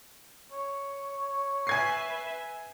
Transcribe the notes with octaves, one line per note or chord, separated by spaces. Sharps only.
C#5
B4 E5 G#5 G#6 C7